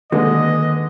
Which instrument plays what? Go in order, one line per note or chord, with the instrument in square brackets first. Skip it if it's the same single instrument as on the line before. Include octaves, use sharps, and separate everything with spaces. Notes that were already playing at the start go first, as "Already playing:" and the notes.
[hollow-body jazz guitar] D#2 [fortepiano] D3 G#3 [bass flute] B4 [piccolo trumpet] D#5